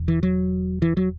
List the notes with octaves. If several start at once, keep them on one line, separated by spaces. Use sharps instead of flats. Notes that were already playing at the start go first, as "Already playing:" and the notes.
Already playing: E1 E2
E3
F#3
E3
F#3